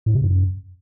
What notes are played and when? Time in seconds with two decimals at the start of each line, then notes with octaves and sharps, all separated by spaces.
0.06 A2
0.15 C3
0.24 F#2